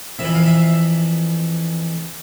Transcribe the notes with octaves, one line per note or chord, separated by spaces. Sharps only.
F2 E3 E5
F5
E5